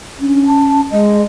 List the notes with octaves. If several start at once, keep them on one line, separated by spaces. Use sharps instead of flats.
C#4 D4
A5
G#3 D#5